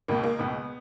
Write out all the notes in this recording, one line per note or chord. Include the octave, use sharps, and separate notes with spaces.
C#2 B2 A#3
A#3
C#2 B2 B3